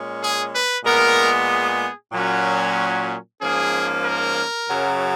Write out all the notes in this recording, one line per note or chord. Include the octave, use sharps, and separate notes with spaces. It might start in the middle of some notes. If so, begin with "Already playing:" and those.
Already playing: A#2 G#3 C#4
G#4
B4
A#2 G#3 B3 A#4
G#4
A#2 F#3 C#4
G#2 F3 A#3 C#4 G#4
A#4
F#2 C#3 F#3